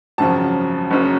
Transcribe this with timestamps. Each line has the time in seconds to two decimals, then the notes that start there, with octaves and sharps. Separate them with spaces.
0.18 G#1 F#2 C#3 F3 A5
0.91 F#1 F#2 C#3